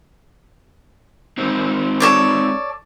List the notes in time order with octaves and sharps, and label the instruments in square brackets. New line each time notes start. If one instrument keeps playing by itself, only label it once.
[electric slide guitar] G#3 C4 D#4
[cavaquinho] A4 C#5 D5